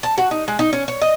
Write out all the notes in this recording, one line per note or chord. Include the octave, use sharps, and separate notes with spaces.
A5
F#4
D#4
G#3
D#4
C#4
C#5
D#5